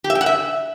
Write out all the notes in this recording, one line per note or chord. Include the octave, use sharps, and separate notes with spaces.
G4
E5
G5
F#5
E5